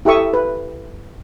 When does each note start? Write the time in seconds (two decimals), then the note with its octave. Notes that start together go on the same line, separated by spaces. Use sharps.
0.05 E4 G4 A4 E5 C#6 D#6
0.34 B4